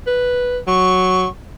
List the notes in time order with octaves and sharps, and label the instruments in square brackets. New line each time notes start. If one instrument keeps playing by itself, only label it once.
[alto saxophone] B4
[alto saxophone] F#3 [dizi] C#6